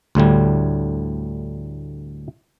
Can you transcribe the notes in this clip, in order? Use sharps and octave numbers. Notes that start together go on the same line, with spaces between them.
D2 A2 D3 G3